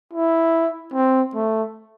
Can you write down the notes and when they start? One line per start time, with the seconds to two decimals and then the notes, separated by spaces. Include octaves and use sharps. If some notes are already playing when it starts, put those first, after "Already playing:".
0.13 E4
0.94 C4
1.34 A3